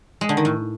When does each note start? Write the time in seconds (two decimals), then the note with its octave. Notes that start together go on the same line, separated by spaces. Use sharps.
0.21 G#3
0.29 D3
0.37 D#3
0.45 A2